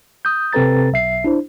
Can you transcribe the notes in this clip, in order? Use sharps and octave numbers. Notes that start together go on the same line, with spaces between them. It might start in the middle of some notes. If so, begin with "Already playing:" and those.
D#6 G6
C3 C4 A4 B4 A#5 A6
B1 E5 C7
D4 E4 C5